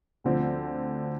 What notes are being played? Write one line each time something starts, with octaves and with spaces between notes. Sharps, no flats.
D2 D3 F3 C4